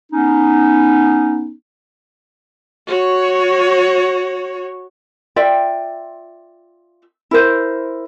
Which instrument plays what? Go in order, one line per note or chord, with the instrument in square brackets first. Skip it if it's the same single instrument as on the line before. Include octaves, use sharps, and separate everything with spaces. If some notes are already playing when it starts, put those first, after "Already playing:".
[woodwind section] B3 C#4 D#4
[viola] F#4 C#5
[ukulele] F4 D5 E5 G5
E4 A#4 C5